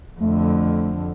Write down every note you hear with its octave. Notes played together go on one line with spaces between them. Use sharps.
F2 D3 A3